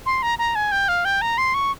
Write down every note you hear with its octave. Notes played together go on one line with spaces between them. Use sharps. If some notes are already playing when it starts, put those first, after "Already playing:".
C6
A#5
A#5
G#5
G5
F5
G5
A#5
C6
C#6